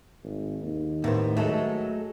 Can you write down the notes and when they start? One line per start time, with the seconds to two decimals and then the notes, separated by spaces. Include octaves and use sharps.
0.24 G#1
0.63 D#2
1.04 A2 A#3 B3 C5
1.37 F#3 G#3 A3 A4